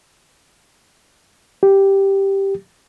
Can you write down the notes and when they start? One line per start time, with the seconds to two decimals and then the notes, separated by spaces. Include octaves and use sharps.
1.63 G4